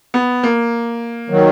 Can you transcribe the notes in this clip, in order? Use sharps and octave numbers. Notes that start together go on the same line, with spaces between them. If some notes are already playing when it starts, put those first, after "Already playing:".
B3
A#3
D#3 F#3